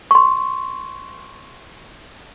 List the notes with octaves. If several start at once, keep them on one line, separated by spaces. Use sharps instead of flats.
C6 C#6